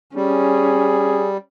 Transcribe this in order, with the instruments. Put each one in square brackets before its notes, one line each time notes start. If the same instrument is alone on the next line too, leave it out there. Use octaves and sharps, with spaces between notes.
[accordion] G3 [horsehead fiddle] C#4 [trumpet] G#4